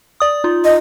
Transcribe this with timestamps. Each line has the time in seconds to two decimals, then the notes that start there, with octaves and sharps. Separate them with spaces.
0.20 D5 D#6
0.44 D#4 F4
0.65 D#5